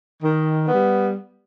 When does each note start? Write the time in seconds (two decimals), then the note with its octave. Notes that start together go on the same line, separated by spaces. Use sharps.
0.23 D#3
0.68 G3 B3